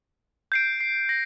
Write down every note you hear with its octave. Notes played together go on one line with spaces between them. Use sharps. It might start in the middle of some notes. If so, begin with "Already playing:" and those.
G6 C7 D7
C7
A#6